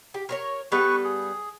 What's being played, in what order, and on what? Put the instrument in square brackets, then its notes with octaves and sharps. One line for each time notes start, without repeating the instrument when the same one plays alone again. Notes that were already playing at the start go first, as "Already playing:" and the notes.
[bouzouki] G4
A#4 C5 C#5
[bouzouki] G3 B3 A4 [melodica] B4 C#6
[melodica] G#4